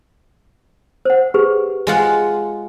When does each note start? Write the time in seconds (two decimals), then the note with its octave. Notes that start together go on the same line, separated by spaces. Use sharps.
1.05 C5 F#5
1.34 G4 G#4 B4
1.87 G#3 F4 F#5